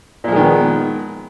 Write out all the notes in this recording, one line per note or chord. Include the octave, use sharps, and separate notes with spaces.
A#2 D#3 F3 G#3 B3